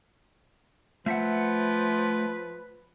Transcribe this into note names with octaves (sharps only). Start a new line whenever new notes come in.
F3 A3 B4 E5 F#5